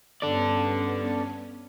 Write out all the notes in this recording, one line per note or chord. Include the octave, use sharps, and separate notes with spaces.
G2 B3 C#4 A4 D5